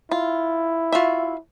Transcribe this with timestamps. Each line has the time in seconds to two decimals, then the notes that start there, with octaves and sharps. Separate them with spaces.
0.11 E4 F4
0.92 F4 F#4 E5